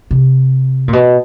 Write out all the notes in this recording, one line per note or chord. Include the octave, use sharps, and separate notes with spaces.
C3
A#2
B2